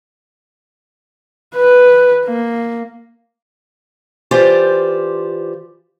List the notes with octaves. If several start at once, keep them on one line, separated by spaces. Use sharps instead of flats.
B4
A#3
E3 F4 G4 C5 D5